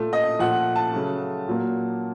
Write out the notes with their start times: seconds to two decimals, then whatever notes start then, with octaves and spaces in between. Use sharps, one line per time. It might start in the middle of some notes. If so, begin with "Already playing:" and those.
Already playing: A#2 A3
0.13 D#5
0.39 A#2 F3 A3 F#5
0.76 A5
0.93 C#3 F#3 A3
1.48 A#2 F#3 A#3